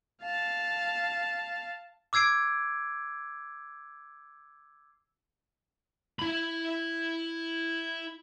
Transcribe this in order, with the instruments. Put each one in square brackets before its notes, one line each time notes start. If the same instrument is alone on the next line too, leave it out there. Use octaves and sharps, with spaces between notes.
[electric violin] F5 A5
[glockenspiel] D6 E6 G#6 C7 D7
[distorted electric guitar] E4 B5